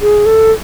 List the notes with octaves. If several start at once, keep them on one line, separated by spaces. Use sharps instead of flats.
G#4
A4